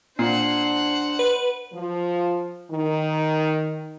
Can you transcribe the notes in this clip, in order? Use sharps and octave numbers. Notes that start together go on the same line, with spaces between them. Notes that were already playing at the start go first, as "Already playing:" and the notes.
A#2 D4 C5 F#5 C7
B4
F3
D#3